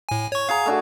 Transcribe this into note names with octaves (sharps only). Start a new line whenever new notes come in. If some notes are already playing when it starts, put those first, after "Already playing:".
A2 G#5
C#5 C#6
G#4 F5 F#5 A#5
A3 D4 F#4